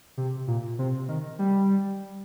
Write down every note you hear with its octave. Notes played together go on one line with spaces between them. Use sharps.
C3
A#2
C3
D#3
G3